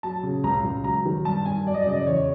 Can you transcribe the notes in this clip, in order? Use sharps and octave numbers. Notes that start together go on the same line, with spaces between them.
F#3 A5
C#3
C#2 A#5
C#2
F#3 A#5
D#3
G2 A5
G2 G#5
F#3 D5
D#5
D5
C#3 D#5
D5
E2 C#5